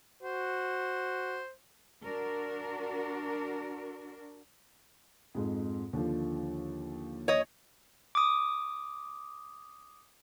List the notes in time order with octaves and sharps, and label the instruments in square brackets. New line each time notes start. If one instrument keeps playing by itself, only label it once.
[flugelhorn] F#4 [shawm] C5
[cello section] D4 F#4 A#4
[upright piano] F2 G#2
D#2 D3 F3
[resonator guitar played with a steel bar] C#5 D#5
[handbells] D6 D#6